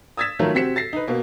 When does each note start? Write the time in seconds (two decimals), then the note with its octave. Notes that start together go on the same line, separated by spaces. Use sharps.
0.17 D#6 E6 G#6 A6 B6 E7
0.39 D#3 F#3 A3 F4 A#4 C#5
0.54 C3 C4 F#4 B6 C#7 E7
0.76 A6 A#6 C7
0.93 D#4 B4
1.08 B2 A#3